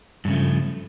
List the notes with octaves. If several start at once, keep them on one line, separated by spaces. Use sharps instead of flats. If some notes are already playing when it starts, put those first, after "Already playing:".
G2 C#3 F3 A3